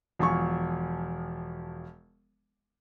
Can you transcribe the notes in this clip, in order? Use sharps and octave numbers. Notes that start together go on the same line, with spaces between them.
E1 F3 G#5 C#6